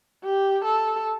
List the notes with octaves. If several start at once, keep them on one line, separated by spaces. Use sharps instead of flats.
G4
A4